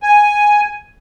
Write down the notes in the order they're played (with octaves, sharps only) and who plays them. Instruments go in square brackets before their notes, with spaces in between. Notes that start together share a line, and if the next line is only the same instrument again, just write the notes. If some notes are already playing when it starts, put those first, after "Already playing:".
[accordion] G#5